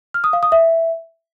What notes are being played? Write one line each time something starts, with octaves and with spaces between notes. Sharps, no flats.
F6
D#6
F5
D#6
E5